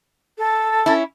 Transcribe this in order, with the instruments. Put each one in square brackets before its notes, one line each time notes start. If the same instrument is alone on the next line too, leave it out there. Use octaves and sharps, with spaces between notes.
[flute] A4
[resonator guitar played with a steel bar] C#4 E4